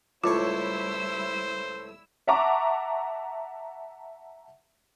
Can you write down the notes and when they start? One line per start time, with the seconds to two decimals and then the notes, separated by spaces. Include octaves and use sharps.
0.24 C#2 A2 G3 E4 F4 C5 C#5 E6
2.27 E5 F#5 A5 A#5 C#6 D6